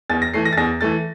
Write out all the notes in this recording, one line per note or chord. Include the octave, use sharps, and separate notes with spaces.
E2 A6
A#6
E3 A3 C7
A#6
A6
E2 A#6
E3 A3 A6